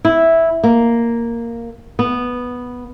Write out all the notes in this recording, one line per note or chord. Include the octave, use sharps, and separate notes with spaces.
E4
A#3
B3